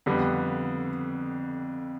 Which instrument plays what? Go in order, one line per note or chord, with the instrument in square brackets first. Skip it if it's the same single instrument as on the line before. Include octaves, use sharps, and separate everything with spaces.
[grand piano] F2 D3 G3 B3